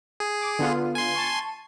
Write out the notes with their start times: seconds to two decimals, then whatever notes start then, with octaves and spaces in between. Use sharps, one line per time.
0.20 G#4
0.41 D6
0.59 D3 B3 F4
0.95 G#5 C6
1.16 A5 C#6